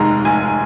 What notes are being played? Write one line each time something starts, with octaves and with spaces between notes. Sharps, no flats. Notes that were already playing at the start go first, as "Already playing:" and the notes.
Already playing: F1 D#2 D#3 G#3 A#5
F1 G#5